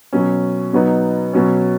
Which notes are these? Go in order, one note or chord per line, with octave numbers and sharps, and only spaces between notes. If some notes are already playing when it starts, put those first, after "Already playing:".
B2 F#3 C#4
B2 F#3 B3 D#4
B2 F#3 C#4